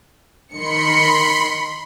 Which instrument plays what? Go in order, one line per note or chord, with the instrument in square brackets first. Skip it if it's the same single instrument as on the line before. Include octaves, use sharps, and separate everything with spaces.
[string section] D#3 C#7 [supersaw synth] B5 C6